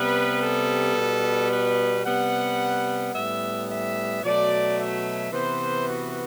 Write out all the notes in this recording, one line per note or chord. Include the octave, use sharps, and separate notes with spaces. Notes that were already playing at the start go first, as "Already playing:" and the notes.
Already playing: C3 G3 B3 B4
A4
B2 G3 B3
B4
C3 G3 B3 F#5
A2 G3 B3 E5
E5
B2 F#3 A3 D5
E5
C3 E3 B3 C5
F#4